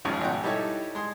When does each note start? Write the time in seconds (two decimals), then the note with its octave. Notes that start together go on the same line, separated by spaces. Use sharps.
0.05 G#1 C#2 G#2 C#3 F3
0.21 G#1 B2 F#5 G5
0.44 G3 D#4 E4 G4 A4 C#5
0.95 G#3 C6 D#6